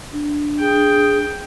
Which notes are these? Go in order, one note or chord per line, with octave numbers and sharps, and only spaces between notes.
D4
G#4 G5